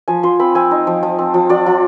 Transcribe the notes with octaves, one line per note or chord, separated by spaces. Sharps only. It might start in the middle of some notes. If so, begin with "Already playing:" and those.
F3 G#5
F3 C6
C4 B5
C4 G#5
D#4
F3
F3
C4
F3
F3 D5
F3